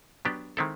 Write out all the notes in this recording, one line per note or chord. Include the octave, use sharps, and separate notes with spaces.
F#3 B3 D4 G4
D#3 G#3 C4 E4 A4